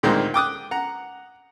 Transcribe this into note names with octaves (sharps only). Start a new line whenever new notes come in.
D2 A#2 D#3 G#3 A#3 C4
G5 D6 D#6 F#6
F#5 A#5